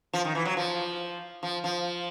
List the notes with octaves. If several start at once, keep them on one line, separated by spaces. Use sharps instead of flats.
F3
D#3
E3
F#3
F3
F3
F3